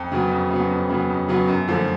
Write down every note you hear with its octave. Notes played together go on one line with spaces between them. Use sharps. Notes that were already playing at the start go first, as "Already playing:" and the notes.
Already playing: F2
C#3 F#3 B3
F2
C#3 F#3 B3
F2
C#3 F#3 B3
F2
C#3 F#3 B3
F#2
D3 F3 A3